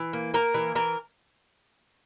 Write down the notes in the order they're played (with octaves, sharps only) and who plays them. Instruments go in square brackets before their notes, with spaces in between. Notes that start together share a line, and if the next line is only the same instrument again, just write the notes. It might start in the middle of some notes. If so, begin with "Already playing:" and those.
Already playing: [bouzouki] E3
A#3
A#3 A#4
E3
E3 A#4